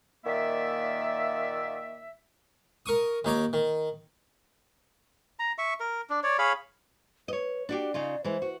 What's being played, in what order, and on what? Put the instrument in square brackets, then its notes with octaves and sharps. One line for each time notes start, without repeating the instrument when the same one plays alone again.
[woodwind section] A#2 D#3 A#3 D5 E5
[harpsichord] A#4 C#6 D#6
D#2 D#4 C#5 D6
D#3
[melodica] A#5
E5 C#6
A#4
D4
C#5 D5
G#4 C#5 F5 B5
[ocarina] B4 [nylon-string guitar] C#5 D#5
[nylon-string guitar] D4 F#4 G4 [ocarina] D5
[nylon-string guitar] C#3 D#4 F4
[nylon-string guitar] E3 G#3 [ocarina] C5
[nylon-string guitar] F#4